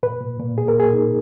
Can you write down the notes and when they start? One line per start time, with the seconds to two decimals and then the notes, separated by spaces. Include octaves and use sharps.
0.03 A#2 B4
0.21 A#2
0.39 A#2
0.57 A#3 G#4
0.68 A#4
0.75 A#2 G#4
0.93 D#4